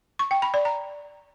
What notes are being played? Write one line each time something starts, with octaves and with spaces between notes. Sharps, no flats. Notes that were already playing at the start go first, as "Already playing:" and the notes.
C#6
G5
B5
D5
A#5